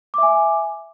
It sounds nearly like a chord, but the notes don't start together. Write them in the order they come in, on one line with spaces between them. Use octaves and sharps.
D6 E5 G#5